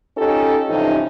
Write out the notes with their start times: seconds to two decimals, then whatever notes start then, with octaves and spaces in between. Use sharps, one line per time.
0.17 C#4 D#4 F4 G4 A4
0.69 G2 C3 E3 F3 C#4 D#4